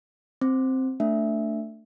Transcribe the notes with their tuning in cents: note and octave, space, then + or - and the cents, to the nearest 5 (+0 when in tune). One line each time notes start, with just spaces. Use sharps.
C4 +0 C5 +0
A3 +20 D4 +0 E5 +0